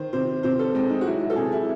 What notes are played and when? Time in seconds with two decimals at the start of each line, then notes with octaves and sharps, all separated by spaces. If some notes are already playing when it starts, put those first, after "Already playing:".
Already playing: D#3 C5
0.13 C3 C5
0.43 C3 C5
0.59 A4
0.75 G#3 C4
0.90 D#4
1.01 F#4
1.05 F#3 E4
1.30 A4
1.36 C3 G#4
1.52 E4